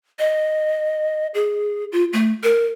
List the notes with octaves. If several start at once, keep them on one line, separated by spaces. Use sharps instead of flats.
D#5
G#4
F4
A3
A#4